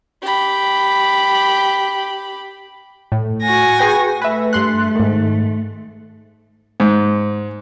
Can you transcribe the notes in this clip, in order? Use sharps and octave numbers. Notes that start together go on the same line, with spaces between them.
G4 B5
A2
F#4 G#5 A#6
G#4 B4 G5
A3 B4 E5
G2 C6 F#6
G#2 D#3
G#2